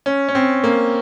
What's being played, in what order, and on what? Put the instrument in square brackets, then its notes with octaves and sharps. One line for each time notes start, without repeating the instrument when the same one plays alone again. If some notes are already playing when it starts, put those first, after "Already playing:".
[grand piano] C#4
C#4
C4
A#3